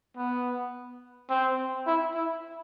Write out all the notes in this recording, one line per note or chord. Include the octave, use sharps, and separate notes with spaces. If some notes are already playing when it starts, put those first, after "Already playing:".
B3
C4
E4
E4